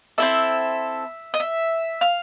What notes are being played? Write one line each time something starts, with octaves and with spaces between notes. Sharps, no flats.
C4 E4 A4 E5
D#5
E5
F5